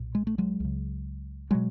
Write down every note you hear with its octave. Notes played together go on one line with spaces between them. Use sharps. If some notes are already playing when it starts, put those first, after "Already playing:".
Already playing: B1 A#2
G#3
A3
F#3 G#3
C#2 C#3
B2 F#3 G#3